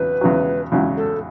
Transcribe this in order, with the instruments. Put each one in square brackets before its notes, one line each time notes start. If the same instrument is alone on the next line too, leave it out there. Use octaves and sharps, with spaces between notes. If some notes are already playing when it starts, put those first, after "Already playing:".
Already playing: [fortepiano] E2 C#3 F#3 [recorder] B4
[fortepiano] E2 C#3 F#3
E2 C#3 F#3
[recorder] A4